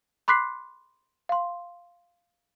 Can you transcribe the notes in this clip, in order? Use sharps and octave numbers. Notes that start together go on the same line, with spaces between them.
B5 C6 D6 F#6 B6 C7
F5 C6